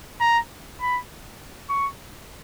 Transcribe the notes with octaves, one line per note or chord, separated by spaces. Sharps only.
A#5
B5
C#6